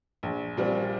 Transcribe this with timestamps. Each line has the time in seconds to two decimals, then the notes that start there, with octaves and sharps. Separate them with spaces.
0.23 A#1
0.57 A#2 G3 C4